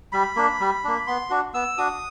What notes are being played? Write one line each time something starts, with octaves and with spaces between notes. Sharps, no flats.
G3 B5
A#3 D4
G3
A#3 D4
B3 C6
D4 F#4
B3 E6
D4 F#4 D#6